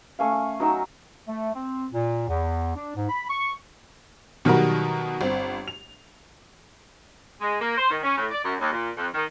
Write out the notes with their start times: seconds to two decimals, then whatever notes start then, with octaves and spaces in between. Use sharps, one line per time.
0.19 A3 C#4 F5
0.33 F5
0.60 F#3 D#4 A#5 E6
1.28 A3
1.54 C4
1.93 A#2
2.28 E2
2.75 D4
2.95 G#2
3.09 B5
3.29 C#6
4.45 B2 D#3 F#3 G3 F#4 A#4
5.21 G1 C4
5.68 F7
7.41 G#3
7.61 A#3
7.78 C5
7.91 D#3
8.03 C#4
8.18 A2
8.31 D5
8.44 F#2
8.61 D#2
8.73 A#2
8.98 F2
9.15 D#3